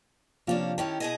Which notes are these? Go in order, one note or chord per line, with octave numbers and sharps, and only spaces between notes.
C3 F3 A#3 C#4 D4 F4
D#3 C#4 E4 G4 A5
B2 G#4 D#5